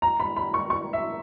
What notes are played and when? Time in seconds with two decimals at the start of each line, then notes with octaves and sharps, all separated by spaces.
0.02 A#5
0.20 B5
0.36 B5
0.54 C#6
0.70 C#6
0.93 E5